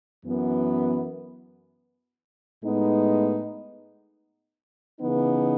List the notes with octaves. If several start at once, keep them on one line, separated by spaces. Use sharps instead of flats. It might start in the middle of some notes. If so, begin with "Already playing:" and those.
F#2 E3 B3
A2 G#3 B3 D#4
C#3 E3 B3 D#4